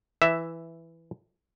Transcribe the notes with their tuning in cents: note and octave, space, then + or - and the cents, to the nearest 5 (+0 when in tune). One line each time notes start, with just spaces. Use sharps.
E3 +5 E5 +0